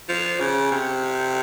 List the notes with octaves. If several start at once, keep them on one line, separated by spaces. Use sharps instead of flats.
F3
C#3
C3